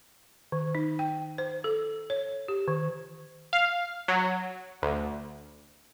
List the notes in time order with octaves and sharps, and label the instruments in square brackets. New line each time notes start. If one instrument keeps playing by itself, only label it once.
[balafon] D#3
D#4
G5
C5
A4
C#5
G4
D#3
[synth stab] F5
F#3
D2